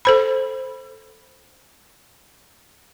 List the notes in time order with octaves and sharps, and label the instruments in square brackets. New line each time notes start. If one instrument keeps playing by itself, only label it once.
[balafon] A4 C5 B5